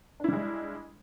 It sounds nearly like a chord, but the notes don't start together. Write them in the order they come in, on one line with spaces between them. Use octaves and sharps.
D4 E4 G3 G#3